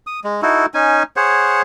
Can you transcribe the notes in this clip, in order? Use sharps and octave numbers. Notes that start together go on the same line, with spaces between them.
D#6
G#3
D#4 E4 F#4 A4
C#4 D#4 G#5
G#4 C5 C#5 F#5